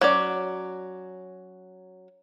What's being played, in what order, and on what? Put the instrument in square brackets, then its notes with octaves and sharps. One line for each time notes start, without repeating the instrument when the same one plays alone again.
[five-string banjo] F#3 C#4 D5